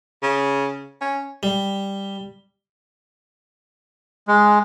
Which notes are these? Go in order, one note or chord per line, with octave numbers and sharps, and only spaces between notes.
C#3
C#4
G3
G#3